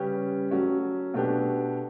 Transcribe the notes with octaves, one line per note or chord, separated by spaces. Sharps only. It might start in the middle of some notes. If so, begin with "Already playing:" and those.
Already playing: C#3 G3 C#4 G4 B4
F#3 A3 C#4 F#4
B2 A3 D4 G4 B4